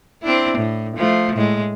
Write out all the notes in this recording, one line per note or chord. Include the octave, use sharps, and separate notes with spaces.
C4 D4 E4
A2
F3 A3
A2 G#3